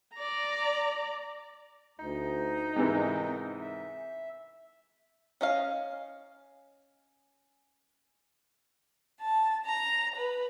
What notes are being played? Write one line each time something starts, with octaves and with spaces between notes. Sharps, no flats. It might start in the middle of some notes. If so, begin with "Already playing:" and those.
D5 A#5
D2 D#4
G#2 C3 E3 A#4
E5
C#4 D#5 F5
A5
A#5
B4